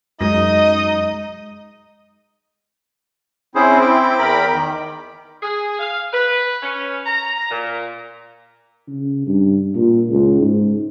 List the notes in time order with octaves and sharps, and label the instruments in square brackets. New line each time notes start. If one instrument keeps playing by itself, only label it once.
[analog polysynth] F#2 [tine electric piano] G#3 A#6 [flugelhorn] D#4 [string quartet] D#5
[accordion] C4 E4 [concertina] C#4 G#4 C5
[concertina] G5 D6
[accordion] E2 A#4 B5
D#3
[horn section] G#4
F5
B4
C#4
A#5
A#2
[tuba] C#3
G2
A#2
C#2
G#2